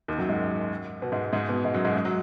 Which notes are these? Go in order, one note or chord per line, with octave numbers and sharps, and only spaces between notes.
D#2 D#3
F#2 F#3
G#2 G#3
B2 B3
G#2 G#3
G#2 G#3
B2 B3
G#2 G#3
F#2 F#3
G#2 G#3
G#3
F#3